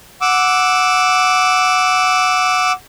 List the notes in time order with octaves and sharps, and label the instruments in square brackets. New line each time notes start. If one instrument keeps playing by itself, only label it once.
[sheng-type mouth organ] F#5 D6 E6